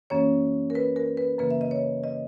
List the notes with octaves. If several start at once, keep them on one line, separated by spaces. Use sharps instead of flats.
F#2 E3 A#3 C#4 C#5
A#4
B4
A#4
B4
F#2 C#3 E3 A#3 B4
E5
D#5
C#5
D#5